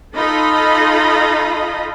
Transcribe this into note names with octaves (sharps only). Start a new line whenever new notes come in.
D#4 F4 A4 D#5 B5